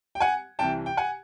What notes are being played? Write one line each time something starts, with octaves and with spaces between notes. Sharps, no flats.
G5
F#5 G#5
C2 C3 E3 G5 A5
G5
F#5 G#5